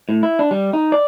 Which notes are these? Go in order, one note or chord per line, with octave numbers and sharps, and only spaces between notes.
A2
E4
D4
G3
D#4
D5